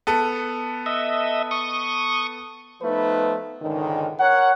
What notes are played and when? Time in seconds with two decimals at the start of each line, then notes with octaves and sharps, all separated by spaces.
0.07 B3 A4
0.86 D#5 E5
1.51 C#6 D#6
2.82 F3 A3 B3 D#4 B4
3.62 C#2 G#2 D3 D#3
4.19 A#4 C#5 F#5